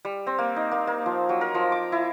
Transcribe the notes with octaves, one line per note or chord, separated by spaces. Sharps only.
G3
C4
A#3
D#4
A#3
A#3
F3
F#3
A#4
F3
D6
E4